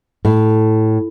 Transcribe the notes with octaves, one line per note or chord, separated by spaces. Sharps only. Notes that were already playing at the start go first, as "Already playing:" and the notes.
A2